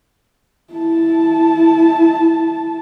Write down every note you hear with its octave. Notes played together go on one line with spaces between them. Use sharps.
E4 A5